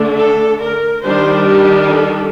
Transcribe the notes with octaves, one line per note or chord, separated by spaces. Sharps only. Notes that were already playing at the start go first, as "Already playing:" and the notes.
Already playing: D3 A3 D4
A4
A#4
D#3 G3 D4 C5
G4
A4